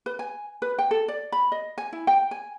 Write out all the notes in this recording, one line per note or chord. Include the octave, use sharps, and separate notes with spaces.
B4
G#5
B4
G5
A4
D5
B5
D#5
G#5
E4
G5
G#5